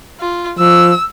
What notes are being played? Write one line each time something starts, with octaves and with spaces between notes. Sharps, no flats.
F4
F3 E6